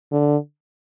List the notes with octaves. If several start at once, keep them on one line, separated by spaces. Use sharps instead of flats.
D3